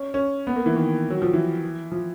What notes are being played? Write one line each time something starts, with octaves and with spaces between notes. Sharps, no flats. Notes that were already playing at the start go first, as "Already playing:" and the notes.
Already playing: C#4
C#4
B3
A#3
E3
D#3
F#3
F3
E3
F3